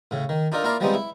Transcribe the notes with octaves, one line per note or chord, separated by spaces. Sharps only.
A2 C#3
D#3
D4 D#4 F4 A4 A#4
A#3 E4 F4 D5 F5 A#5
F3 G3 G#3 B3 C4 D#4
E4